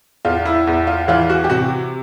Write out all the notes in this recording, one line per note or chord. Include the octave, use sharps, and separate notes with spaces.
E2 F4
E4
E2 E4
F4
E3 F4
F#4
G4
C3 F#4